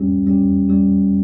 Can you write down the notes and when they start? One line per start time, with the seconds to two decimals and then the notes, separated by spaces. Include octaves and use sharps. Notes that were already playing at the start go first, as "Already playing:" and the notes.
Already playing: G3 C#4 G4
0.26 G3 C#4 G4
0.69 G3 C#4 G4